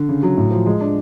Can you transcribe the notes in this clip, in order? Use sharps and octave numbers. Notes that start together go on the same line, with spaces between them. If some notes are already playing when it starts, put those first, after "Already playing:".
Already playing: D3
C#3
F#3
A2
F3
G#3
D4